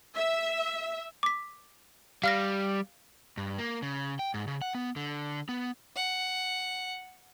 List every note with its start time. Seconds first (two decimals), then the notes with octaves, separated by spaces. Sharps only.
0.15 E5
1.23 D6 B6
2.24 G3 F5 F6 A#6
3.37 G2
3.58 A#3
3.82 C#3
4.19 G5
4.34 G#2
4.48 C#3
4.62 F#5
4.75 B3
4.96 D3
5.49 B3
5.96 F#5